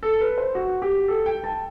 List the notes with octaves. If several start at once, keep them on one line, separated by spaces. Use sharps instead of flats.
A4
B4
C5
F#4
G4
A4
G5
A5